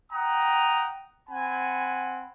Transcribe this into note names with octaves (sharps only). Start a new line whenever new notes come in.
F#5 G5 A#5 D#6
C4 F#5 G#5 B5